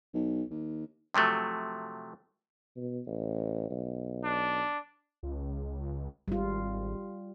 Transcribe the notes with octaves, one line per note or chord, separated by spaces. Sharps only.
B1
D#2
C3 F3 F#3 A3
B2
A1
B1
D4
C#2
G#1 G3 F4